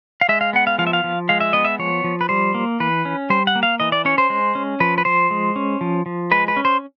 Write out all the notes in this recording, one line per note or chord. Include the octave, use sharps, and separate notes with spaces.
F5
G#3 E5
F5
B3 F#5
F5
F3 F5
E5
F5
F3
G#3 F5
E5
B3 D#5
E5
F3 C#5
F3
B4
G3 C5
A#3
E3 B4
C#4
G3 C5
F#5
A#3
F5
E3 D#5
D5
C#4 C#5
C5
G#3
C#4
F3 B4
B4
F3 C5
G#3
C#4
F3
F3
G#3 B4
B4
C#4
C5